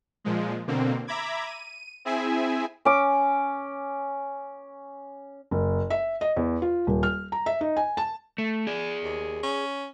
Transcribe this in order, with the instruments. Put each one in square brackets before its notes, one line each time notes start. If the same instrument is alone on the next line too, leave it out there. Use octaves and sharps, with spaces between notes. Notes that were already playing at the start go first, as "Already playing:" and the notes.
[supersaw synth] A#2 F3 G#3
B2 D3 A#3 C4
E5 A#5 B5 D6 G#6
D#7
C4 E4 G#4 E5 G#5
[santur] C#4 D6
[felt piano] F#1
E5
D#5
E2
F4
D#1
F6
A#5
E5
D#4
G#5
A5
[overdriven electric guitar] A3
G#4 D5
[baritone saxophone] D#2
C#4